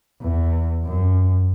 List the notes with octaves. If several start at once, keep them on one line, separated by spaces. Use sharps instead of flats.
E2
F#2